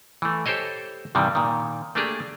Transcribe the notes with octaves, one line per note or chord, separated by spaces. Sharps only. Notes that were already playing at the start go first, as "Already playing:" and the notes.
E3 A3
G4 A4 C5 C#5 D#5
G2 C3 D#3 E3 G3
A#2 D#3
A3 A#3 D4 G4 G#4